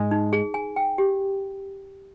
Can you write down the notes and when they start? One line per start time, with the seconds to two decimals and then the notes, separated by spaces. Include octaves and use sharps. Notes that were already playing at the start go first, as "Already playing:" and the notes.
Already playing: G#2 G#3
0.11 D#4
0.33 G#4
0.54 G#5
0.76 G5
0.98 G4